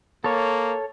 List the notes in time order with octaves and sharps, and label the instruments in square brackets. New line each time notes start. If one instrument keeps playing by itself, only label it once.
[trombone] A#3 [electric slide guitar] A4 C#5